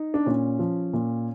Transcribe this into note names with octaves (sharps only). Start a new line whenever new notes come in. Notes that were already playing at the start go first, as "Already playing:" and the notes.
Already playing: D#4
D4
A#2 C#4
F3
A#2